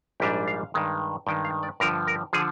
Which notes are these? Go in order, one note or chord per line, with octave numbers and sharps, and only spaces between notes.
A#1 G#2 G3 D4 G4
F5
G2 D#3 G#3
G2 D#3 G#3 G5
F5
D5
G2 D3 F3 A#4
A#4
D3 F3 G#4